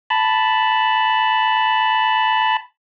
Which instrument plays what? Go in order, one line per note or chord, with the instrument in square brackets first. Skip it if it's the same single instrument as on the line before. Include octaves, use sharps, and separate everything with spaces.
[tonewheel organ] A5 B5